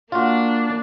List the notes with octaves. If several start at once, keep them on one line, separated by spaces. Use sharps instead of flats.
A#3 D4 F4 F#4